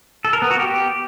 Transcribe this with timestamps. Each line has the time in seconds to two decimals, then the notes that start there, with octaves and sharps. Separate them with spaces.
0.25 A4
0.33 A#4
0.42 B3
0.51 F#4
0.59 G4